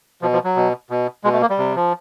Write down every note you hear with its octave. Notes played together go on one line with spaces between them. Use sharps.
B2 F3
F3
F#3
B2
B2
B2 G#3
A3
A#3
G3
C3
F3